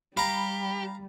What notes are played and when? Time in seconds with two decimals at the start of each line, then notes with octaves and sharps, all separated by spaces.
0.17 G3 G4 F5 A#5 B5